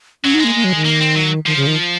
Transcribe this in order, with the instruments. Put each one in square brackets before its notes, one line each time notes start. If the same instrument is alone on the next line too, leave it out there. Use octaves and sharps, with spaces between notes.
[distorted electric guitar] F#3 [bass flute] C#4
[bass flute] D#4
[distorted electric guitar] G#3
[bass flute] A#3
A#3
F#3
D#3
[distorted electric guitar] A#3
C4
F#3
[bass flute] D#3 [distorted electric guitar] F3
[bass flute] C#3
D#3